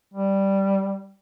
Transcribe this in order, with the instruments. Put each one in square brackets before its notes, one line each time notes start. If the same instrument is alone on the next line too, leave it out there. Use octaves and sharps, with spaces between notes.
[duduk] G3